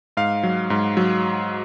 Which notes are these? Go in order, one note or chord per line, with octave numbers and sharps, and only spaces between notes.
G#2 F5
F#3
G#2
F#3